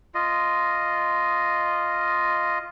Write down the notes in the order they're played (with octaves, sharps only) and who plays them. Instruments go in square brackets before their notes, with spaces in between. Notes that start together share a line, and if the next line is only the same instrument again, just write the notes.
[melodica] F4 D#5